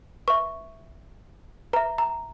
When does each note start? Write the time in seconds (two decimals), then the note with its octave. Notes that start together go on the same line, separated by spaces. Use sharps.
0.28 B4 E5 C#6
1.73 B4 E5 A#5
1.98 A#5